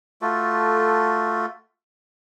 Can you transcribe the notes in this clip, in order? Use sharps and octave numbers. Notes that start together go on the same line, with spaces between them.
A3 F4 F#4 A4